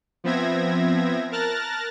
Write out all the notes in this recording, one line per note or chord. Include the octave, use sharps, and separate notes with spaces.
F3 B3 C4 E5 G#6 A#6
A#4 A5 F6 F#6 A6 A#6